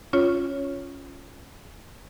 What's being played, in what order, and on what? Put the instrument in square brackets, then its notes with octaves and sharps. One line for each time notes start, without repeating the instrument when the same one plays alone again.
[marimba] C#4 F4 C#5